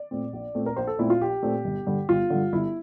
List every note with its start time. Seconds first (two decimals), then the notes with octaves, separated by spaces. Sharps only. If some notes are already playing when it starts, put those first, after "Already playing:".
Already playing: D5
0.11 A#2 A3 C4
0.33 A#1
0.55 A#2 A3 C4
0.66 A#4
0.76 A#1 C5
0.87 A4
0.99 A#2 A3 C4 E4
1.10 F4
1.21 A#1 G4
1.43 A#2 A3 C4
1.65 G1
1.87 G2 D3
2.09 G1 F4
2.30 G2 D3
2.53 G1 E4